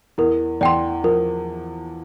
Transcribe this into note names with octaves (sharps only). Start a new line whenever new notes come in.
E2 E3 A#4
E2 E3 D5 G5 C6
F3 A#4